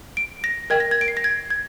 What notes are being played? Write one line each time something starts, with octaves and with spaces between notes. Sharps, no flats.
D7
A#6
A#4 D#5 G5 G#6
A#6
G#6
D7
C7
A#6
G#6
G#6